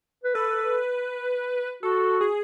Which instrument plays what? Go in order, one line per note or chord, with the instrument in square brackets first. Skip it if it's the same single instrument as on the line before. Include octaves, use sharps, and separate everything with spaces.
[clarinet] B4
[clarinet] A4 [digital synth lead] B4
[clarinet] F#4 [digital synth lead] A4
[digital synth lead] G#4